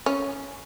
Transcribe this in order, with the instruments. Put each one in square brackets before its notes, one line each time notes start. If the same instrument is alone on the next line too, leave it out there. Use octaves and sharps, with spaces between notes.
[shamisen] C#4